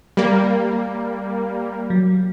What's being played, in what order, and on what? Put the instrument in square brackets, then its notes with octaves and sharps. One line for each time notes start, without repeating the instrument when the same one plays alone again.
[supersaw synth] G3 A#3
[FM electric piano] F#3